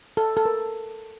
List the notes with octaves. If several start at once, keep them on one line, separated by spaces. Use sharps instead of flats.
A4
A4
A#4